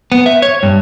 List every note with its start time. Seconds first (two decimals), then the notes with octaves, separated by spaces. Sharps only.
0.12 B3
0.26 E5
0.42 C#5
0.63 G2